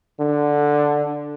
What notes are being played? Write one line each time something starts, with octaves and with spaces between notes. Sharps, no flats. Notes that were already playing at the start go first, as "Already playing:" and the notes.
D3